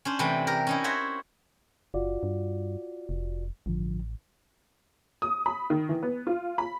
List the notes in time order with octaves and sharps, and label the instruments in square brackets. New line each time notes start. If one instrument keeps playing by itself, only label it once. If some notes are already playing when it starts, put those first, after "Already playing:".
[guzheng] C#4 D4 C5
C3 E3 A3 B4 G5
G4 A#4
C#4 D#4 E4
F#4 C5 C#5 E5
[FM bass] F#1 [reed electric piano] F4 F#4 D5
[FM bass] G2
F1
[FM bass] A1 [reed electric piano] G2 D3 F3
[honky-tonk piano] D#6
B5
D#3
E3
B3
F4
B5